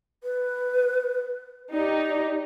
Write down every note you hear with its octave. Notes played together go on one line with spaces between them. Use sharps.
B4
D#4 G4 D5